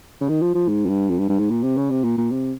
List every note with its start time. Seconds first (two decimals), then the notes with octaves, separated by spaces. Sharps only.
0.21 C#3
0.29 D#3
0.42 F3
0.54 F3
0.68 G#2
0.85 F2
0.89 G2
1.09 F2
1.19 G2
1.29 G2
1.39 G#2
1.50 A#2
1.63 C3
1.77 C#3
1.90 C3
2.04 A#2
2.18 A#2
2.32 C3